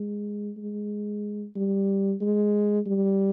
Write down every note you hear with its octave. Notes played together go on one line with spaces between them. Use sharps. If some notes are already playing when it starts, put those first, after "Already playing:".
Already playing: G#3
G#3
G3
G#3
G3